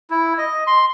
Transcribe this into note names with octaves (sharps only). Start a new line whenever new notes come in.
E4
D#5
C6